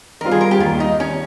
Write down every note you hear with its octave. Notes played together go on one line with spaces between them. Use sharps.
D#3 G3 C4 F4 A#4
G#4
A#4
G4
D#2 D#3 G3 F4
D#4
C#4